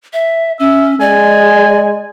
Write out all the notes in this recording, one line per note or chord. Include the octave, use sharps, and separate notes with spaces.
E5
C#4 E5
G#3 D5 G#5